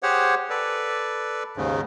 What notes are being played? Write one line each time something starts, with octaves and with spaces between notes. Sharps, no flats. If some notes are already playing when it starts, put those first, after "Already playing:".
G4 G#4 C5 C#5 F#5
A4 B4 D5
D#2 G#2 C#3